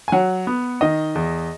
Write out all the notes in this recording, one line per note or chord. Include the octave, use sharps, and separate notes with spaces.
G#5
F#3 F#5
B3
D#3 D#5
E2